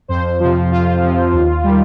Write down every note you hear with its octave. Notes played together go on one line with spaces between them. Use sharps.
F2 C5
C3 F3
F2 F4
C3 F3
D#2
D#3 G3